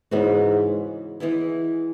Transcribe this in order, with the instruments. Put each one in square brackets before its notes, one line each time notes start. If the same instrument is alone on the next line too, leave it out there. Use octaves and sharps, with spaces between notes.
[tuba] G#2 [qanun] C#3 E3 B3 F#4
[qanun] E3 G#3 B3 E4